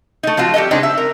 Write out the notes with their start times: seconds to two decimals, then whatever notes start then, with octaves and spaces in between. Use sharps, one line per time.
0.23 A3 D#4
0.37 F3 C4 F4 F#4
0.54 G3 G4 A4 A#4 D#5
0.71 C#3 G#3 C4 D4 D#4
0.83 E5
0.98 A#4